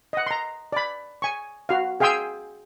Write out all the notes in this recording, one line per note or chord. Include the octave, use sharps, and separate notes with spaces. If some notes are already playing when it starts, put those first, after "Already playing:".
D#5 F#5
A#5 C6
D5 B5
G#5 C#6
F#4 F5
G#4 F5 G5 G#5 C6 E6